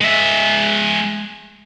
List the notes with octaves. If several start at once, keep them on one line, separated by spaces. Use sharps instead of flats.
G#3 E5